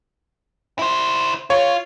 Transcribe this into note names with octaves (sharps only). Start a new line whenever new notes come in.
E4 C5
F4 C#5